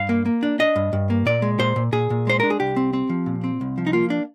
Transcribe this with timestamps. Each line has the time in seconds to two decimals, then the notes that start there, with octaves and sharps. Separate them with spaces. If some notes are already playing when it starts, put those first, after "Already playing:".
Already playing: G2 F5
0.09 A#3
0.26 A#3
0.43 D4
0.59 D4 D#5
0.76 G2
0.93 G2
1.10 A#3
1.26 A#2 D5
1.42 G#3
1.59 A#2 C5
1.76 A#2
1.92 A#2 G#4
2.10 A#2
2.27 G#3 C5
2.40 D4 A#4
2.50 G#4
2.60 C2 G4
2.76 C4
2.93 C4
3.10 F3
3.26 A#2
3.44 C4
3.61 C2
3.78 F3
3.87 D#4
3.93 A#3 F4
4.10 D4